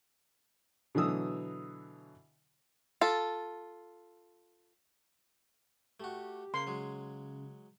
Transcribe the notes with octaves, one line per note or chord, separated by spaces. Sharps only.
B2 D3 E3 F#3 D#6 E6
F4 A4
A3 F#4 G4
C#3 A#3 C6
F#3 G#3